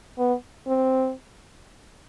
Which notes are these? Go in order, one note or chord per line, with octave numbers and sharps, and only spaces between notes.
B3
C4